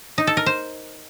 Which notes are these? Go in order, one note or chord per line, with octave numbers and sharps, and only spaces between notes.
D#4
A4
A#4
C5